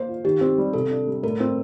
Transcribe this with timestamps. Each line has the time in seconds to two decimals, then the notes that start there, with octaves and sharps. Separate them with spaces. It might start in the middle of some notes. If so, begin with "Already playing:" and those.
Already playing: A#3 C5
0.09 F4
0.24 D#3 G4
0.41 C4
0.58 G3
0.73 C3 A4
0.91 D4
1.07 G3
1.23 A2 A#4
1.40 C4